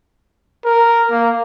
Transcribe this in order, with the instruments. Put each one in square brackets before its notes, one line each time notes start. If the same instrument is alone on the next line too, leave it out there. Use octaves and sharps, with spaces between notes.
[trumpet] A#4
A#3